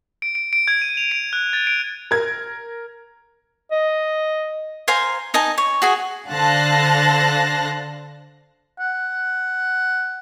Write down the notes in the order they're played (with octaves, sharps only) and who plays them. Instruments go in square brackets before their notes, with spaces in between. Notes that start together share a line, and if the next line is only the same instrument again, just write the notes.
[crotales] D7
D7
D7
G#6
D#7
F7
D7
F#6
A6
D7
[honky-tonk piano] A#4 G#6
[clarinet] D#5
[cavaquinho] C5 F5 G#5 A#5
D#4 D#5 G#5 A5
C#5
F#4 G#4 G#5
[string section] D3 C5 F5 A5 F#6 A#6
[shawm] F#5